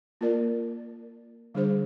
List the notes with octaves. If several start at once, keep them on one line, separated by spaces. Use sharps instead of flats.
A#3 F4 A#4 D5
D3 G3 D4 G#4 C5